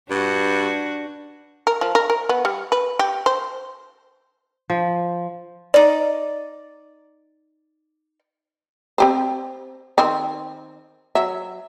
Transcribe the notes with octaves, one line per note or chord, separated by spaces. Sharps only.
G2 D4 F#4
A#4
F3
A#4
A#4
B3
G3
B4
G4
C5
F3
D#4 D5
C4 G4 C5
D#3 C4
F#3 E5